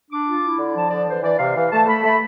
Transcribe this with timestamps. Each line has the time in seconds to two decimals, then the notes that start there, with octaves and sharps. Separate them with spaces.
0.10 D4 D6
0.26 F4
0.42 E4
0.58 D3
0.74 F3 A5
0.90 D3 D5
1.07 E3 C5
1.23 E3 D5
1.38 C3 F5
1.55 E3 F5
1.71 A3 A5
1.87 A3 B5
2.03 A3 B5